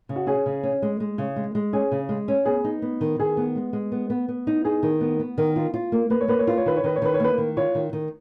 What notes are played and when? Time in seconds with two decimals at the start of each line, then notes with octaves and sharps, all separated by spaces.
0.09 C#3
0.16 F#4
0.27 C#4 G#4
0.46 C#3
0.63 C#4
0.82 G#3
1.00 G#3
1.18 C#3
1.36 G#3
1.55 G#3
1.73 C#4 G#4
1.91 C#3
2.09 G#3
2.28 C#4
2.45 B3 G#4
2.64 D#4
2.82 B3
3.01 D#3
3.19 D#3 G#4
3.37 B3
3.55 G#3
3.73 G#3
3.92 B3
4.10 B3
4.28 B3
4.47 D#4
4.65 D#4 G#4
4.83 D#3
5.01 B3
5.19 B3
5.38 D#3 A#4
5.56 F4
5.74 F4
5.92 A#3
6.10 A#3 B4
6.21 C#5
6.28 A#3 B4
6.39 C#5
6.47 F4 B4
6.58 C#5
6.66 D#3 B4
6.76 C#5
6.84 D#3 B4
6.96 C#5
7.02 D#3 B4
7.14 C#5
7.20 A#3 B4
7.38 D#3
7.57 F4 C#5
7.75 D#3
7.93 D#3